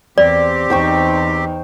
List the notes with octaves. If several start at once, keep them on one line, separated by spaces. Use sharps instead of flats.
E2 C4 G4 D5
E2 D#4 C5 G5 C#6